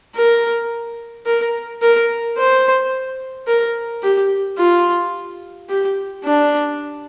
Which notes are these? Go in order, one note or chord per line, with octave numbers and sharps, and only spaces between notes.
A#4
A#4
A#4
C5
A#4
G4
F4
G4
D4